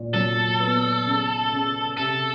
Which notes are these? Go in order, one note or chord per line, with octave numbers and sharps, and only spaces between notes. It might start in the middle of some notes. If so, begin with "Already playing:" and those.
Already playing: A#2
F#3 A4
B3
C#3
C#3
C3 A4